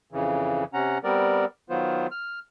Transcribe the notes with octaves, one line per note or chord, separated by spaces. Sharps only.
F2 C#3 E3
C3 C#4 F#5 A#5
G3 B3 C4 A#4 D5
D#3 F#3 B3 F4 C5
F6